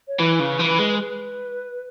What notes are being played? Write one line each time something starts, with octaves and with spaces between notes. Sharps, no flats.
C#5
E3 B4
C#3
E3
G#3
B4